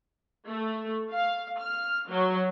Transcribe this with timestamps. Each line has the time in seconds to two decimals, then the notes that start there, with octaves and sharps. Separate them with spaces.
0.48 A3
1.14 F5
1.60 F6
2.10 F#3